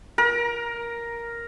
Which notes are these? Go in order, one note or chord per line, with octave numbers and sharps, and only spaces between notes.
A#4